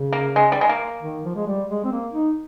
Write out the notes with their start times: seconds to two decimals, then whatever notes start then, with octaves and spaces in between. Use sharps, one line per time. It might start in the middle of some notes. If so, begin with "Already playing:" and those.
Already playing: C#3
0.13 A#3
0.36 G#3
0.52 G3
0.61 G#3
0.69 A#3
1.02 D#3
1.25 F3
1.36 G#3
1.47 G3
1.69 G#3
1.84 C4
1.92 A#3
2.13 D#4